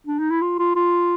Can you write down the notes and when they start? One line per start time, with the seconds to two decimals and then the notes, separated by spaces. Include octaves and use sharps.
0.07 D4
0.19 D#4
0.30 E4
0.41 F4
0.59 F4
0.76 F4